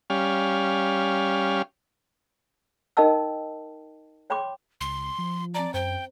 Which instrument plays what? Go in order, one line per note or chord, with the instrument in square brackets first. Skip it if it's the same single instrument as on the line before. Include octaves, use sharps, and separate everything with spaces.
[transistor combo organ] G3 C#4 F5
[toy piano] D#4 A#4 D#5 G5 A5 E6
C#5 G5 B5 C6 D6
[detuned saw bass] C#2 [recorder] C6
[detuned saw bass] F3
[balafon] C4 A5 A#5 [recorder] D5
[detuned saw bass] F#2 [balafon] C5 [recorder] G5